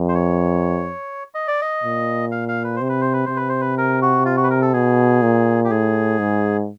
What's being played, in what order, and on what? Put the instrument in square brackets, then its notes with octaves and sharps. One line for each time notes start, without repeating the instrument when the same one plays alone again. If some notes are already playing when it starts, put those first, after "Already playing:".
Already playing: [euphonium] F2
[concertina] C5
C#5
D#5
D5
D#5
[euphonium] A#2
[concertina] F5
F5
B4
[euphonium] C3 [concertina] C5
[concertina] B4
C5
B4
[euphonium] C3 [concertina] C5
[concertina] B4
C5
B4
A#4
F#4
F4
F#4
B4
A#4
A4
[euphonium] B2 [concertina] G#4
[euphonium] A#2
[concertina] G4
[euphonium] A2 [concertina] G#4
[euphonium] G#2